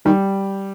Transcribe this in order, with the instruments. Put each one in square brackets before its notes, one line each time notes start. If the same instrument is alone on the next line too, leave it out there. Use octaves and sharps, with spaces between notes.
[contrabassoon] D#3 [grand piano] G3